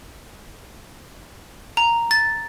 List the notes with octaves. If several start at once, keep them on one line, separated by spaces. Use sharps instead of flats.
A#5
A6